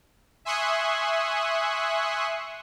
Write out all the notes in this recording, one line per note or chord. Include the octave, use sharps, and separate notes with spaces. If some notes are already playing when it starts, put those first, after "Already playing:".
E5 G#5 C6 C#6 D#6 F#6